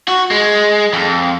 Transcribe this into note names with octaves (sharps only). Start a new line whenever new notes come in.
F#4
G#3
F2